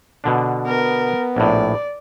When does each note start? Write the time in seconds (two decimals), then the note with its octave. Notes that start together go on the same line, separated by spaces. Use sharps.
0.24 B2 D3 D4
0.67 B3 A#4
1.36 A#1 A2 D5